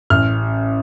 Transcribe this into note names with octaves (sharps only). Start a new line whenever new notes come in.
A1 F6